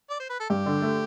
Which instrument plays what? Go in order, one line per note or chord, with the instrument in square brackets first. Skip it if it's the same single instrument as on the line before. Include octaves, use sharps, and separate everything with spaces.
[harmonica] D5
C5
B4
A4
[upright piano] G2 [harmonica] G4
[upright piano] D3
A3